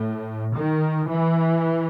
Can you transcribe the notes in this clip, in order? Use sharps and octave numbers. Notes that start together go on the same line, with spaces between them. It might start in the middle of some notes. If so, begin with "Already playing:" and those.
Already playing: A2
D#3
E3